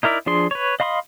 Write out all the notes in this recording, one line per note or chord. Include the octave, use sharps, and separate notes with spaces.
D#4 E4 A#4 D5 E5
F3 D4 G#4 C6
B4 C#5
D#5 F5 B5 C6 D#6